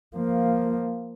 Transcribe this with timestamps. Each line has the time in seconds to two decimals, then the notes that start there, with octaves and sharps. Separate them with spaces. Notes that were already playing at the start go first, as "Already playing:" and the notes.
0.16 F3 A#3